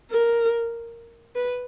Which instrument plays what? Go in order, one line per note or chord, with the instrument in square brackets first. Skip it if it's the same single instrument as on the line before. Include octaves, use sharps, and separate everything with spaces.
[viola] A#4
B4